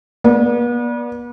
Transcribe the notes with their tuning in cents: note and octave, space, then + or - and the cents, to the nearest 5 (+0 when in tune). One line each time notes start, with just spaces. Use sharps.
B3 -40 D5 +0